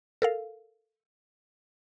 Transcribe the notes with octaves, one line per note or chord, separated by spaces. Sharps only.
A4 A#4 F5